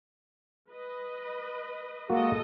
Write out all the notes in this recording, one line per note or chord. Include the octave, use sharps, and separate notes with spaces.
B4 D#5
G#3 A#3 F#4 A4 D#5